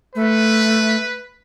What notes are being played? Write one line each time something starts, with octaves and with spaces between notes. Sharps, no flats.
A3 B4